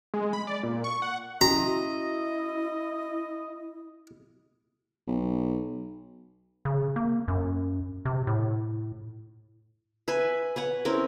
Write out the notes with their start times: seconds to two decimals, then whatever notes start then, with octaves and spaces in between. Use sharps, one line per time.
0.14 G#3
0.33 B5
0.47 D5
0.63 A#2
0.84 C#6
1.02 F#5
1.41 C#4 E4 F#4 D#5 A#5
5.07 B1
6.65 C#3
6.96 A#3
7.28 F#2
8.05 C3
8.27 A2
10.08 B4 E5 G#5
10.56 B4 C#5 F#5
10.85 C4 C#4 E4 A#4